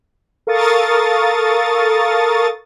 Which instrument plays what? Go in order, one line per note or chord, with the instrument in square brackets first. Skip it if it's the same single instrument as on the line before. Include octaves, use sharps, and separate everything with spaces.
[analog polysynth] A4 A#4 F5 C#6 D#6 A6